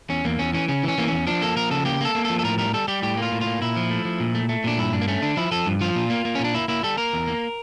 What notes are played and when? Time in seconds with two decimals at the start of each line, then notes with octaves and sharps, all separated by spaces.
0.10 E2 C#4
0.25 E2 A#3
0.39 E2 C#4
0.53 E3 C#4
0.68 C#3 C#4
0.83 E3 C#4
0.98 E3 A#3
1.08 E2 C#4
1.27 F3 D4
1.42 A#3 A4
1.57 F3 A#4
1.71 C#3 A4
1.85 A#3 G4
2.01 A#3 A4
2.15 A#3
2.25 F3 A4
2.39 A4
2.44 A2 A#4
2.58 G3 A#4
2.74 G3 A4
2.88 G3 G4
3.03 A2 G4
3.17 A#3 F4
3.32 A2
3.41 F4
3.47 A#3
3.61 A#2 E4
3.76 F3
3.90 A3
4.05 F3
4.20 A#2
4.35 A3
4.49 A3
4.64 A#2 D4
4.78 G2 E4
4.93 G2 D4
5.02 A#3
5.08 A3 C#4
5.22 D3 D4
5.37 F3 E4
5.52 F3 A4
5.66 G2
5.81 F3 F4
5.96 A#2
6.10 A#3
6.25 A#3
6.35 C#4
6.39 A#2 D4
6.54 A#3 E4
6.68 A#3 E4
6.83 G3 A4
6.98 A#3 A#4
7.13 E2
7.27 A#3